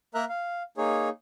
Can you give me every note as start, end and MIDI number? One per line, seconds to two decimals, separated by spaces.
0.15 0.25 58
0.15 0.25 70
0.15 0.25 76
0.15 0.25 82
0.15 0.25 90
0.29 0.63 77
0.78 1.09 58
0.78 1.09 63
0.78 1.09 68
0.78 1.09 73